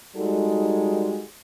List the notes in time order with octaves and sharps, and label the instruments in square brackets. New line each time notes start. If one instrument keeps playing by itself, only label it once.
[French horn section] G3 G#3 D#4 F#4 A4